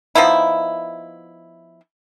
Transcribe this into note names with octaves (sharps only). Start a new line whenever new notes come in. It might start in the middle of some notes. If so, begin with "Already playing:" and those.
F3 B3 D#4 E4